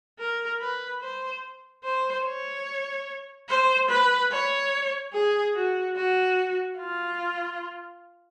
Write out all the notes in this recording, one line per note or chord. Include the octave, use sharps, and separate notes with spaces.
A#4
B4
C5
C5
C#5
C5
B4
C#5
G#4
F#4
F#4
F4